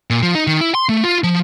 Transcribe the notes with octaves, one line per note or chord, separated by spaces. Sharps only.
A#2
F3
D#4
D#3
E4
C6
A3
F4
F3